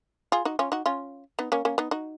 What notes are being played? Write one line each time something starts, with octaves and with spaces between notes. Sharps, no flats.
F4 G#4
D#4 F#4
C#4 F4
D#4 F#4
C#4 F4
B3 D#4
A#3 C#4
A#3 C#4
B3 D#4
D#4 F#4